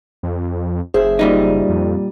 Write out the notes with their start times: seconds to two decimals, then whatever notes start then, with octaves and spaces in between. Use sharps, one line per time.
0.23 F2
0.94 F#1 G#4 C5 E5
1.19 A#2 G3 D#4
1.69 F2